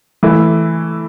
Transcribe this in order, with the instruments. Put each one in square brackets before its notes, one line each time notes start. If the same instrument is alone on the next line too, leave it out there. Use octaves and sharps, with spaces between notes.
[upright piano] E3 A3 E4